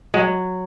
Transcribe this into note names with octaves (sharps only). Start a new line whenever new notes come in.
F#3 G#3